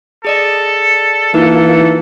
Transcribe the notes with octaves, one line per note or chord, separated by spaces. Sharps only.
G#4 A4 D5 D#5
E3 A#3 D#4 F4